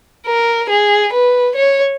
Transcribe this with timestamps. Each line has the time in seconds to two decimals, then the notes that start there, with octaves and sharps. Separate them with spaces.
0.27 A#4
0.70 G#4
1.13 B4
1.55 C#5